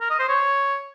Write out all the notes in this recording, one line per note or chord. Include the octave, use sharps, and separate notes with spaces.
A#4
D#5
C5
C#5